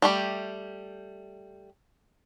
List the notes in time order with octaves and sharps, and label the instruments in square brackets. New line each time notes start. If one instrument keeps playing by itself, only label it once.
[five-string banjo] G3 A3 G4